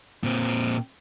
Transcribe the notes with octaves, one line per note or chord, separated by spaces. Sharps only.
A#2 C4